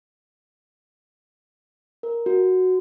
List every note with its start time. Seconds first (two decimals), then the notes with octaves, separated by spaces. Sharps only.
2.03 A#4
2.26 F#4